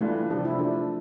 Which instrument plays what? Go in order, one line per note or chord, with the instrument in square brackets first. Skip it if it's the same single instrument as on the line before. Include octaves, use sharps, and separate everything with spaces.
[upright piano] E3 G3 D4 F4 [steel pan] A3
[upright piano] C3 F3 A3 [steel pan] D4
[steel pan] E4
[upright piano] F3 A3 E4 [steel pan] D4